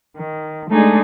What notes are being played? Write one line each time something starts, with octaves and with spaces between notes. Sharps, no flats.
D#3
G#3 A3 D4 D#4 G#4